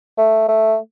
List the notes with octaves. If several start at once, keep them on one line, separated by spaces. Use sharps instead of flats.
A3
A3